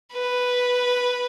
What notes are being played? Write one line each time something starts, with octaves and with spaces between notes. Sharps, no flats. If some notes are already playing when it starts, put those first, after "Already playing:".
B4